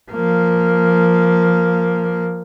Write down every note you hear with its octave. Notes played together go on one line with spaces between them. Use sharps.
F3 A#3